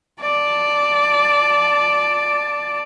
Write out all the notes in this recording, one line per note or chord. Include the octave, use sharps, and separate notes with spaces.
D5 A5